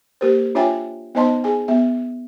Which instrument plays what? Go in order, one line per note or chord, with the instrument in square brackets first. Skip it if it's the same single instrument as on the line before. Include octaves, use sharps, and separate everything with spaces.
[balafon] A#3 G4 A#4 C5
D4 F4 C#5 E5 G5 G#5
B3 D#4 C5 D#5 A5 C6
G#4 G#5
B3 E5